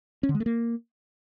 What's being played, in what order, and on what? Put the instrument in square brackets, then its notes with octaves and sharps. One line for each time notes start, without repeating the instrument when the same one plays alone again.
[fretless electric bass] C#4
D3
G#3
A3
A#3